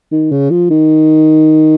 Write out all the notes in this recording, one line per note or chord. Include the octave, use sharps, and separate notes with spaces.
D#3
C#3
F3
D#3